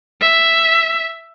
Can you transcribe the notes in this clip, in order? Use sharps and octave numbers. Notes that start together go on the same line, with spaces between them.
E5